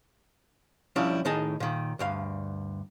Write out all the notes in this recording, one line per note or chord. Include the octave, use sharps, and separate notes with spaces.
F3 G3 C#4 D4 E4
A2 D#3 D#4 G#4 D#5 A5
A#2 D#3
D2 G2 F5